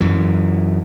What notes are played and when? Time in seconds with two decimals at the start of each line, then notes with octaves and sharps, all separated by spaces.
0.01 F#2 E3